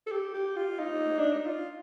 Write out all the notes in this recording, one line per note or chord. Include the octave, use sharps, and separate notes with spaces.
A4
G4
G4
F4
D#4
D4
D#4
F4